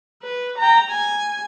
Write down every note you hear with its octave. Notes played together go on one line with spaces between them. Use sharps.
B4
G5 A#5
G#5